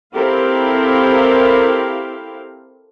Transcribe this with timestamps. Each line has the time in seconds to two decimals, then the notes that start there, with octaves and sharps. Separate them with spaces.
0.14 C4 E4 G4 A4 A#4 F5